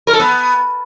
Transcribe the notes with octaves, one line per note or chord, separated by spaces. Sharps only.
A#4
A4
B3